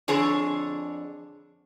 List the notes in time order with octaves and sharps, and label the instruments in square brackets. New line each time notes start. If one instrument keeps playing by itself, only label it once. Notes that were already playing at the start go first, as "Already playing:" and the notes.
[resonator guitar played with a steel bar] F2 D3 G#4 C#5